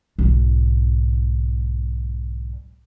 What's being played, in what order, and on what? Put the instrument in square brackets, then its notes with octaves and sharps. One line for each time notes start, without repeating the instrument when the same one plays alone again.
[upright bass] B1 G#2